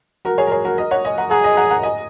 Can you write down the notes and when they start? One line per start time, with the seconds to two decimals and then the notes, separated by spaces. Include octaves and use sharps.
0.25 F#4 A#4
0.38 G#4 C#5
0.47 A#4
0.52 G#4 C#5
0.65 F#4 A#4
0.78 A#4 D#5
0.91 C#5 F#5
1.05 D#5 G#5
1.18 F#5 A#5
1.31 G#4 F#5 A#5
1.44 D#5 G#5
1.57 F#5 A#5
1.71 F#5 A#5
1.83 D#5 G#5